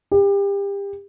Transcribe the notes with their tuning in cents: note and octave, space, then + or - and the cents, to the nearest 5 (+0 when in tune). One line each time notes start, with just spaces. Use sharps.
G4 +30